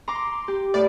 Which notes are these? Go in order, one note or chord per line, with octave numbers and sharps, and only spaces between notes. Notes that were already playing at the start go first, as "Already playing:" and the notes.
A#5 C6 D6
G4
A2 D5